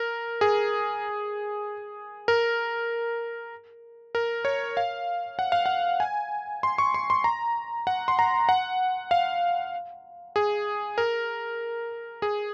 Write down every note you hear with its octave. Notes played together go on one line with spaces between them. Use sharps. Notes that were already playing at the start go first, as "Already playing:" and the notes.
Already playing: A#4
G#4
A#4
A#4
C#5
F5
F#5
F5
F#5
G#5
C6
C#6
C6
C6
A#5
F#5
C6
A#5
F#5
F5
G#4
A#4
G#4